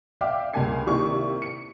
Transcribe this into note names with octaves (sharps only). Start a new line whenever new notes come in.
D5 E5 F5 G5 D6
C#2 G2 A#3 G#5 G#6 C7
C3 D#3 A#3 E4 D5 C#6
C#7